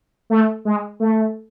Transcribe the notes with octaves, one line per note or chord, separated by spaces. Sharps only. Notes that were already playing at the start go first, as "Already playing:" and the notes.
A3
G#3
A3